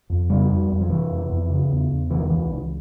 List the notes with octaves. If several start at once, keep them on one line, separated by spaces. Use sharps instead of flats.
F2
C#3 G3
F2
F2
F3
C3 E3
F2
F2
C#3
E2
E2
C3 E3
D#3
C#2 E3
C#2